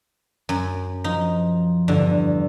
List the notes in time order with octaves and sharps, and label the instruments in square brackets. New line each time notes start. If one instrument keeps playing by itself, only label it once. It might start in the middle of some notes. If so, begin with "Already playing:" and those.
[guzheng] F#2
[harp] F3 [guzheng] D#4
[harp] E2 G2 [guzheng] D3